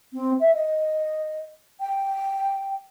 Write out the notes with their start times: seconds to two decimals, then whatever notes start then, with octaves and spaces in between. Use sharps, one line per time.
0.13 C4
0.40 E5
0.54 D#5
1.81 G5